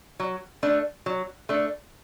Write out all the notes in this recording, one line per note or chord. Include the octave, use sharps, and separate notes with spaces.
F#3
A3 D4
F#3
A3 D4